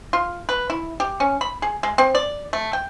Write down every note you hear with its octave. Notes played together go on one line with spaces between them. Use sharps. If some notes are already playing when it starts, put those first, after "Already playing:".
F4
B4
E4
G4
C#4
B5
G#4
G#3
C4
D5
A3
G5